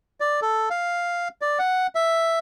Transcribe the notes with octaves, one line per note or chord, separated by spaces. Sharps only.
D5
A4
F5
D5
F#5
E5